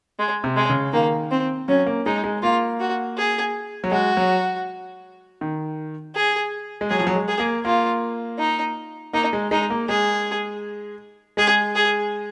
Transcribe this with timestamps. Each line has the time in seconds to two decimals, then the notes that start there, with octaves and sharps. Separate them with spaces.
0.19 G#3
0.44 C3
0.57 G#3
0.70 C#3
0.93 D#3 A#3
1.31 C4
1.68 F#3 C#4
1.86 A#3
2.06 G#3 D#4
2.24 G#3
2.43 A#3 F4
2.80 F#4
3.18 G#4
3.84 F#3
3.91 G#3 F#4
4.17 F#3
5.41 D#3
6.15 G#4
6.81 G#3
6.90 F#3 G#4
7.00 F3
7.07 F#3
7.16 G#3
7.28 G#4
7.40 A#3
7.65 A#3 F4
8.39 D#4
9.13 A#3 D#4
9.33 G#3
9.51 G#3 D#4
9.70 A#3
9.89 G#3 G#4
11.37 G#3 G#4
11.76 G#4